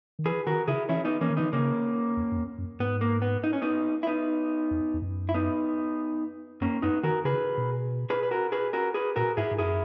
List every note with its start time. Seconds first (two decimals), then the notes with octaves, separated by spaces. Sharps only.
0.19 D#3
0.26 E3 G#4 B4
0.47 D#3 F#4 A#4
0.68 C#3 E4 G#4
0.89 E3 C#4 E4
1.05 B3 D#4
1.21 E3 A#3 C#4
1.30 D#3
1.37 E3 B3 D#4
1.53 C#3 A#3 C#4
2.17 E2
2.32 F#2
2.37 E2
2.58 F#2
2.80 G#2 B3
3.01 A#3
3.22 B3
3.44 D#4
3.53 C#4
3.62 B3 D#4
4.03 E4
4.07 B3 D#4
4.71 E2
4.94 E2
5.02 F#2
5.29 E4
5.34 B3 D#4
6.61 F#2 A#3 C#4
6.82 F#2 B3 D#4
7.03 D#3 F#4 A#4
7.25 C#3 G#4 B4
7.58 B2
8.10 G#4 B4
8.23 B4
8.31 F#4 A#4
8.52 G#4 B4
8.73 F#4 A#4
8.94 G#4 B4
9.16 A#2 F#4 A#4
9.37 G#2 E4 G#4
9.51 G#2
9.58 F#2 E4 G#4